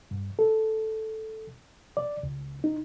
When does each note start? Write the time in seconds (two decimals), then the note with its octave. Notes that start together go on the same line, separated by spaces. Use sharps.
0.11 G2
0.39 A4
1.97 D5
2.23 C#2
2.64 D#4